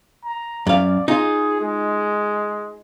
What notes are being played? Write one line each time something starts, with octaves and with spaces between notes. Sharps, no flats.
A#5
F#2 D5 F5
D#4 F4 G#4
G#3